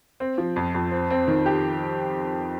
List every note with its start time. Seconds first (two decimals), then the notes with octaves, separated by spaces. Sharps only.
0.20 C4
0.38 F3
0.56 F2
0.75 F2
0.91 C4
1.10 C4
1.28 D#3
1.46 G4